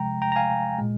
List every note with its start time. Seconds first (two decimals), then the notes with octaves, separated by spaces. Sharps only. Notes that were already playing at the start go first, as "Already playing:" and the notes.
Already playing: C3 F3 G#3 G5 A#5
0.22 G5 A#5
0.32 A#5
0.36 F5 G#5
0.79 A#2 G#3